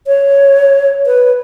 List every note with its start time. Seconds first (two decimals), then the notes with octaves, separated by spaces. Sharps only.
0.07 C#5
1.07 B4